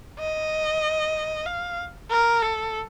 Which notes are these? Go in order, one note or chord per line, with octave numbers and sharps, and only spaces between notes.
D#5
F5
A#4
A4